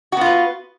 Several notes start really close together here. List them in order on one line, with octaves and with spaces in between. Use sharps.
F#4 B3 F4 B4